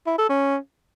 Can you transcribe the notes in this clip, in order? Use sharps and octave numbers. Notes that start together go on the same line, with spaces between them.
E4
A4
C#4